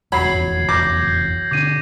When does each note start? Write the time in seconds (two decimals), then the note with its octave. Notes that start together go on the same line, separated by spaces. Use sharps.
0.12 F1 B1 E2 F#3 B5 G#6 C7 F#7
0.69 D6 G6 A6 A#6
1.51 B2 D3 D4 D6 D#7